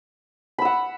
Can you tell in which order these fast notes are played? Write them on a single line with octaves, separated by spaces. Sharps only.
B5 E6 F#5